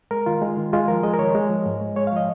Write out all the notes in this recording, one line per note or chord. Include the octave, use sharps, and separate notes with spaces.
G#3 A#4
D#3 F4
G#3
D#3
G#3 F4
F3 A#4
G#3 D#5
A#4
D#3 C#5
G#3
F3
G#2
G#3
G#3 C#5
F5
F3 D#5